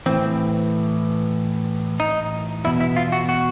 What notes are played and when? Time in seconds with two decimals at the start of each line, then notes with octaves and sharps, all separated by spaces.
0.06 A2 E3 C4
2.00 D#4
2.64 E2 B2 E4
2.80 E4
2.96 F4
3.12 F#4
3.29 F#4